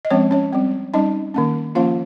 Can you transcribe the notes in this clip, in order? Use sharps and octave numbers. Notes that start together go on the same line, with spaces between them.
D#5
F3 G#3 C4 C#4 C#5
C#4 C#5
G3 C4
G3 C#4 D#4 D#5
D#3 A#3 C#4
F3 A#3 C#4 F4 F5